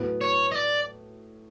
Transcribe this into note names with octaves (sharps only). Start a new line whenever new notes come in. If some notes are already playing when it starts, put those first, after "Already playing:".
Already playing: A2 F#3 B3
C#5
D#5
D5